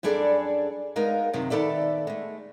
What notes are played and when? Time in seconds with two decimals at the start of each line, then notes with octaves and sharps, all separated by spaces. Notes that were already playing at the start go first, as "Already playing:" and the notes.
0.03 F#2 G3 D4 G#4 A4 D5
0.96 G#3 B3 D#4 A#4 F5
1.33 F#2 C3 D#3
1.50 D#3 B3 A4 D5 E5
2.07 G#3 A3